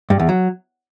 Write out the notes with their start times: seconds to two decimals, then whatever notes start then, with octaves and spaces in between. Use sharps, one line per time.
0.10 G2
0.19 E2
0.29 F#3